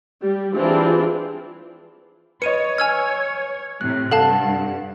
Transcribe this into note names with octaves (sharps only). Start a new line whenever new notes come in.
G3
E3 C4 D4 E4 F4 G#4
B4 C#5 D#5 C#7 D#7
G#5 E6 F6 G#6
A2 C3 F#6
G2 A4 F5 F#5 A5